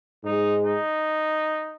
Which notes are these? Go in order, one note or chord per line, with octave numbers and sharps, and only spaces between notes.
G#2 G#3 D#4
D#4